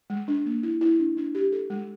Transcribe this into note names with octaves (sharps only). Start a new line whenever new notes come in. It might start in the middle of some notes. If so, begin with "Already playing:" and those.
G#3
D4
A#3
E4
E4
D4
D4
G4
A4
G#3